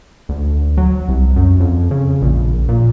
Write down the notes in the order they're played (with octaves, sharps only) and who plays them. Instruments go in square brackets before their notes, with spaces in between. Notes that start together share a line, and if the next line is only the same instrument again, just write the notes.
[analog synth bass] D2
F#3
C2
F#2
F2
C#3
A#1
A#2